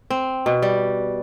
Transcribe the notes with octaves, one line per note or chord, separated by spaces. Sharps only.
C4
B2
G3